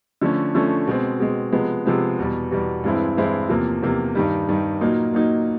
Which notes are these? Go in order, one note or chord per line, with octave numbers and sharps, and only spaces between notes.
D3 F3 A3 C#4
D3 F3 A3 C#4
B2 G#3 C4
B2 G#3 C4
C3 F3 G#3 B3
C3 F3 G#3 B3
E2 B2 G3
E2 B2 G3
G2 E3 G#3 C4 E4
G2 E3 G#3 C4 E4
E2 C3 F3 A#3
E2 C3 F3 A#3
G2 D#3 G3
G2 D#3 G3
A#2 F#3 A#3 D#4
A#2 F#3 A#3 D#4